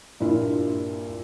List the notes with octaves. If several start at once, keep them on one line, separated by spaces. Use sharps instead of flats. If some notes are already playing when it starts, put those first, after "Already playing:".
G2 A#2 E4 F4